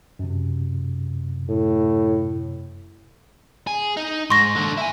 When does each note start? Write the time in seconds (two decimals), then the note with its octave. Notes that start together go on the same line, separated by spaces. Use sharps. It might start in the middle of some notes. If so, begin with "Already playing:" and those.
0.19 F#2 C3
1.50 A2
3.67 G#4
3.97 D#4
4.30 G#2 C6 C#6 A#6
4.55 D#2 D3
4.77 E4 G#5